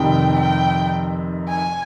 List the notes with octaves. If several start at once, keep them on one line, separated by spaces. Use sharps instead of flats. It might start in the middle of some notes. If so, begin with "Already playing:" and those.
Already playing: F1 F2 C3 D#3 G5
G5
G#5